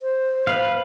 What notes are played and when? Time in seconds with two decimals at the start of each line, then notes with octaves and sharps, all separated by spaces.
0.01 C5
0.47 B4 F5